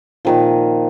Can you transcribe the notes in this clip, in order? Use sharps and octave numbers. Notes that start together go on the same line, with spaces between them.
A#2 D#3 F3